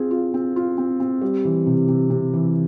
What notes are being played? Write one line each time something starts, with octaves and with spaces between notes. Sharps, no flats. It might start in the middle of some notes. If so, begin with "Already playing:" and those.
Already playing: C4 F4 G#4
F4
C4
F4
C4
C4
G3
E3
C3
C3
C3
E3